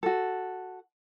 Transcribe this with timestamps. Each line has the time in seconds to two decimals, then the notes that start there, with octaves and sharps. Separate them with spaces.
0.03 F#4 A4